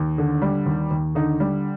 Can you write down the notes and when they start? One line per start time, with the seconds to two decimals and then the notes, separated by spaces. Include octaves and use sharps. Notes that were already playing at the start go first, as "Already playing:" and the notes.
Already playing: D#2
0.18 D3
0.42 G3
0.66 D#2
0.91 D#2
1.15 D3 D#4
1.40 G3